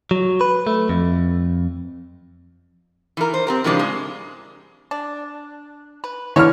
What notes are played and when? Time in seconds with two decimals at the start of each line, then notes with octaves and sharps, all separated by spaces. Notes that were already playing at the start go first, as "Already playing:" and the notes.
0.11 F#3
0.41 B4
0.67 A3
0.89 F2
3.17 E3 A#4
3.34 C5
3.47 C4 G4 A#4
3.64 A2 C#3 F3 G#3 D4 G4
3.79 G#3
4.91 D4
6.04 B4
6.36 D3 E3 E4 C#5 F6